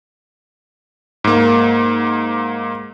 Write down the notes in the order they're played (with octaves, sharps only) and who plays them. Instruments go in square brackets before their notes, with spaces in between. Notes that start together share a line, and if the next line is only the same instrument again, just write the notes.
[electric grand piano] G#2 A#3